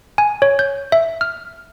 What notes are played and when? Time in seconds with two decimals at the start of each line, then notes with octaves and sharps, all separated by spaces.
0.18 G#5
0.42 C#5
0.59 G6
0.92 E5
1.21 F6